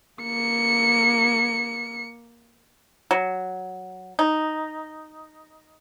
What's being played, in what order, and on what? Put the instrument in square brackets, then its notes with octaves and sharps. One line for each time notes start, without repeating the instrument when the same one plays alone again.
[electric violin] A#3 C#7
[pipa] F#3
D#4